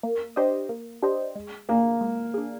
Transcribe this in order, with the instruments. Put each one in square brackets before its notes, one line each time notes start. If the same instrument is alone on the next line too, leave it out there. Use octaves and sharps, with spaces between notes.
[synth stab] A#3
D4 G4 C5 D#5
A#3
D4 G4 C5 D#5
G#3
[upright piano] A#3 [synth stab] D4 G#4
[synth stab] G#3
D4 G#4